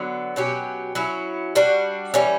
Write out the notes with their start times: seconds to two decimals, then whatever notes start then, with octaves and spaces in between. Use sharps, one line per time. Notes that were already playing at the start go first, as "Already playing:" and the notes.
Already playing: D3 F#3 B3
0.36 B2 F#3 C#4 G4
0.95 F#3 C#4 E4
1.55 G3 D4 F#4
2.14 E3 G3 C#4